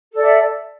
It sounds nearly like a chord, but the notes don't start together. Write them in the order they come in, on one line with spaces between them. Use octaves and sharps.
A4 D5 E5